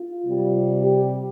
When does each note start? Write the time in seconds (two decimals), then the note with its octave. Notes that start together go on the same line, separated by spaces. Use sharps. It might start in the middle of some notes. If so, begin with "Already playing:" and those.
Already playing: F4
0.25 C3 G3
0.82 G4